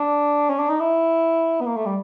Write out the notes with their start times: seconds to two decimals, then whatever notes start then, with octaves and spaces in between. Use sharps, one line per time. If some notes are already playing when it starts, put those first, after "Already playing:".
Already playing: D4
0.50 C#4
0.59 D4
0.69 D#4
0.80 E4
1.61 B3
1.66 A#3
1.76 A3
1.85 G3